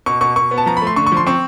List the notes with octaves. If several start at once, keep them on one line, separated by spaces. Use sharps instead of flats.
B2 C#6
B2 C#6
B2 C#6
B3
A5
F3 A#5
B5
A3 C6
D3 C#6
C#6
F3
C6
C4 C#6